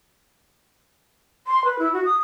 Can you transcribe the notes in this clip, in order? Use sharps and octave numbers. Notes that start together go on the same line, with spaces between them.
C6
B4
E4
F#4
D#6